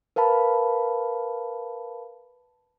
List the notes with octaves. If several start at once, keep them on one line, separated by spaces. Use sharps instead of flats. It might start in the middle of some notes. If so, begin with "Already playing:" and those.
A#4 B4 F5 A5 B5